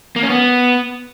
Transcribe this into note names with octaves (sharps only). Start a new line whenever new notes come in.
A#3
C#4
B3